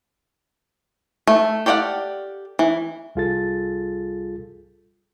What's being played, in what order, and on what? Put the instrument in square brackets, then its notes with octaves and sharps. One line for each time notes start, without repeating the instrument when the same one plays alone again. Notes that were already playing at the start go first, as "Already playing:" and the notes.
[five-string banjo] A3
G4 A4 D5 F5 F#5
E3
[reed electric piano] C2 G3 F4 G#4 A4 A6